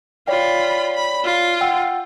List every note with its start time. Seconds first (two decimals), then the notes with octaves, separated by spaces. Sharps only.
0.28 F4 C#5 D5 G5 B5
0.95 B5
1.24 F4
1.61 F#5 G5 E6